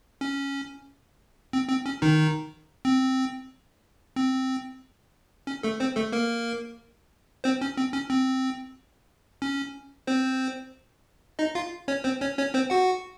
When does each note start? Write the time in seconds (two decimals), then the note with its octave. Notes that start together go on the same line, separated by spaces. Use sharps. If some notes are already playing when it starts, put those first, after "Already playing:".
0.21 C#4
1.53 C4
1.69 C4
1.86 C#4
2.02 D#3 D#4
2.85 C4
4.16 C4
5.47 C#4
5.63 A3 A4
5.80 C4 C5
5.96 A3 A4
6.12 A#3 A#4
7.44 C4 C5
7.61 C#4
7.77 C4
7.93 C#4
8.10 C4
9.42 C#4
10.07 C4 C5
11.39 D#4 D#5
11.55 F4 F5
11.88 C#4 C#5
12.04 C4 C5
12.21 C#4 C#5
12.38 C#4 C#5
12.54 C4 C5
12.70 F#4 F#5